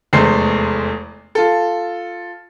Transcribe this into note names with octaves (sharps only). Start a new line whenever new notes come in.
F1 E2 G#3 A3 C5 C7
F4 A4